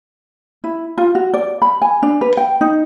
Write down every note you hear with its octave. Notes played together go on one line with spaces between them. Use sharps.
E4
F4
F#4
D5
B5
G#5
D4
B4
G5
D#4